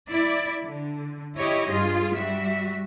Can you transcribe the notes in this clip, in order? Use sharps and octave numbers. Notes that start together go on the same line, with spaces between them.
E4 D5
D3
E4 G4 C#5 D#5
G2 F4 G#4
G3 F#4 E5